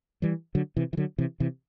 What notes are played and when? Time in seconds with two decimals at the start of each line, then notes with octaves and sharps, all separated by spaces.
0.22 E3 G3
0.55 D3 F#3
0.77 C3 E3
0.93 E3
0.97 D3 F#3
1.18 C3 E3
1.40 C3 E3